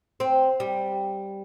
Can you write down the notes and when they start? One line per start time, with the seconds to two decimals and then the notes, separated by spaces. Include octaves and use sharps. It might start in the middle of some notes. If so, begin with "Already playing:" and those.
0.20 C4
0.60 G3